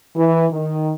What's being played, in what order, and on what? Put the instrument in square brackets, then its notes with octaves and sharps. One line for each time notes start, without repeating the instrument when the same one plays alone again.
[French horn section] E3
D#3